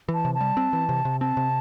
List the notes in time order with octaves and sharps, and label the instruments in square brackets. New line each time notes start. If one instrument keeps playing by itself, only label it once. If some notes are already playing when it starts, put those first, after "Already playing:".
[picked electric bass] E3
[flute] A5
[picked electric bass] C3
[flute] A5
[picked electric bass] G3
C4
E3
C3
C3
[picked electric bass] C4 [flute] A5
[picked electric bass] C3